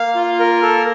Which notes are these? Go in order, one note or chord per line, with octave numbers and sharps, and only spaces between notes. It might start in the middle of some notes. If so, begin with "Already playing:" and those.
Already playing: A#3 F5
F4
A#4
A4